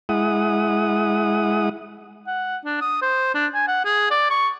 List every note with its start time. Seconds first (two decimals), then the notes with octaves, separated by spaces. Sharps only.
0.09 G#3 E4 F#5 D#6
2.27 F#5
2.65 D4
2.81 D#6
3.02 C5
3.34 D4
3.55 G#5
3.68 F#5
3.85 G#4
4.11 D5
4.30 C#6